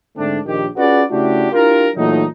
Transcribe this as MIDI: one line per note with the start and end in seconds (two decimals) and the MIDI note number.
0.17 0.39 44
0.17 0.39 50
0.17 0.39 57
0.17 0.39 60
0.17 0.39 62
0.46 0.65 34
0.46 0.65 51
0.46 0.65 67
0.77 1.03 61
0.77 1.03 65
0.77 1.03 66
0.77 1.03 68
0.77 1.03 71
0.77 1.03 74
1.11 1.49 49
1.11 1.49 57
1.11 1.49 62
1.11 1.49 64
1.11 1.49 66
1.11 1.49 67
1.52 1.89 62
1.52 1.89 64
1.52 1.89 65
1.52 1.89 67
1.52 1.89 70
1.96 2.25 46
1.96 2.25 52
1.96 2.25 54
1.96 2.25 57
1.96 2.25 63